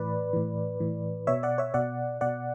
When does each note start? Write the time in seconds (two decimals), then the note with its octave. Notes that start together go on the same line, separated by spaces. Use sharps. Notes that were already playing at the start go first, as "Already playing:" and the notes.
Already playing: A2 E3 B4 D5
0.33 A2 E3
0.80 A2 E3
1.27 B2 C#5 E5
1.43 D5 F#5
1.58 C#5 E5
1.74 B2 D5 F#5
2.21 B2 D5 F#5